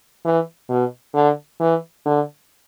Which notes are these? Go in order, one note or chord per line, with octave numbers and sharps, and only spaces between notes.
E3
B2
D3
E3
D3